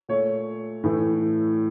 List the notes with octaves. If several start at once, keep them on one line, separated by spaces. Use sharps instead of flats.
A#2 A3 C#5
A2 E3 A3